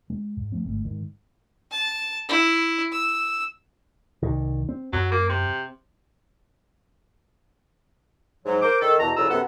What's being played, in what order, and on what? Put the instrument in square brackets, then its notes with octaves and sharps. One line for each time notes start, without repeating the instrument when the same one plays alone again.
[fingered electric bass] G#3
G#2
F3 A3 C4
G1 G#2 A3
G#2 D#3
[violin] A5
E4
E6
[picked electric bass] C2 D#3
C4
[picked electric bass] F#2 [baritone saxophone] F#3
[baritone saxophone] A#3
C3
[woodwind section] G#2 F#3
A#4 C5 D6
D#3 A4
E2 B2 A5 A#5
C2 F2 C#3 F4 A#5 E6
F#2 C3 B3 A4 F#5